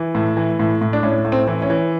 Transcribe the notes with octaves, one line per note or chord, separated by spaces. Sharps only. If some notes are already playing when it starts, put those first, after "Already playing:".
Already playing: E3
A2
E3
A2
A2
D4
A2 C#4
A2
C4
E3
C#4
E3